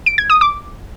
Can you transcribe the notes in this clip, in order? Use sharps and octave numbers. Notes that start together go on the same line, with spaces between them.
D7
G#6
D#6
D6